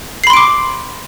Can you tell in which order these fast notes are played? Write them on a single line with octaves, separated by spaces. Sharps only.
C7 B5 C6 D7 D6